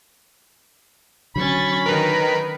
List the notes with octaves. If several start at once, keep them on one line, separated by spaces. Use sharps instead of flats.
D3 F#3 C#4 B5 C#6 A6
D#3 A#4 B4